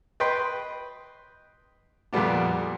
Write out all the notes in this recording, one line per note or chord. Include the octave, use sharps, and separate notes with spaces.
B4 D#5 G5 B5 C6
F2 A#2 D3 G3 B3 D4